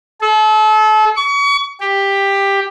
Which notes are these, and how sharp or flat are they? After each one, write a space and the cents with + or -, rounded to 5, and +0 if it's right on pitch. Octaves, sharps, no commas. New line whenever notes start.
A4 -35
C#6 +35
G4 +10